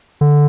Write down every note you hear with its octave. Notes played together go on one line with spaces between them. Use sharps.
D3